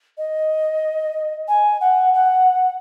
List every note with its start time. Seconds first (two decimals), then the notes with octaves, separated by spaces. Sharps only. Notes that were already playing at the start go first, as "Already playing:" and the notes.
0.18 D#5
1.48 G#5
1.81 F#5
2.14 F#5